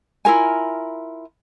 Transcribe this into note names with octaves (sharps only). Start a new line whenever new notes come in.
E4 F4 A#4 G#5